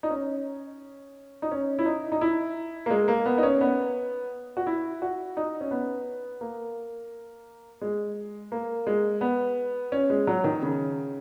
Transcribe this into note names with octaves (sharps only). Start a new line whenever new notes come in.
D#4
C#4
D#4
C#4
E4
D#4
D#4
E4
A#3
G#3
A#3
B3
D#4
C#4
B3
F#4
E4
F#4
D#4
C#4
B3
A#3
G#3
A#3
G#3
B3
C#4
G#3
F#3
D#3
C#3